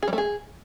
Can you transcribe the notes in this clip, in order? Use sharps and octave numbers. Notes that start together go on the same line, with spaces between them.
G#4
G3
A3
G#4